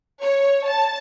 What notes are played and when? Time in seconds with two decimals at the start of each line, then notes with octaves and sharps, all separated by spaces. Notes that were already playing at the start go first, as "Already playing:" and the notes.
0.21 C#5
0.66 A5